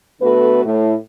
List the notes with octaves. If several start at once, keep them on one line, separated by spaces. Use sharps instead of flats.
D3 A3 B3 F#4 B4
A2